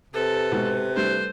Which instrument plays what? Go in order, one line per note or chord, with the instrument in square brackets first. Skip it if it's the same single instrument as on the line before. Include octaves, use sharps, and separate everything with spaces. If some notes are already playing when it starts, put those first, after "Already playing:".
[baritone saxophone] C3 [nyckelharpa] A4 [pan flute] B4
[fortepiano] G#2 B2
[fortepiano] G3 A3 D4 [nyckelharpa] C5